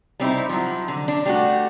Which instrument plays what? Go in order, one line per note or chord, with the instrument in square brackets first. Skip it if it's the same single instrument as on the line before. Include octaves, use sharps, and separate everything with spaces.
[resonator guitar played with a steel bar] G3 C4 D#4 E4
F3 F#3
D3
D4
G3 A3 F#4